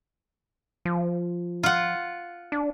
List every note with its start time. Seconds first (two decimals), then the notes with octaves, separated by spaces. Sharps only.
0.85 F3
1.63 F4 F#5
2.52 D4